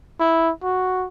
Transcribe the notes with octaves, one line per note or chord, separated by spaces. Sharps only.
E4
F#4